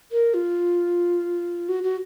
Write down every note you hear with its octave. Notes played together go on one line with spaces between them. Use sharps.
A#4
F4
F#4
F#4